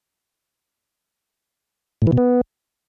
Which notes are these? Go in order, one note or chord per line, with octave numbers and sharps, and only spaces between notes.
A2
E3
B2
B3